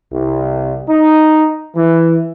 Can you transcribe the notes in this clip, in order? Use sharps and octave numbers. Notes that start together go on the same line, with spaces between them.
C2
D#4
E3